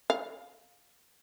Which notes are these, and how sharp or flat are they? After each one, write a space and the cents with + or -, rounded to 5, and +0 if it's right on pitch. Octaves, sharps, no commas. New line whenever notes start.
F5 +25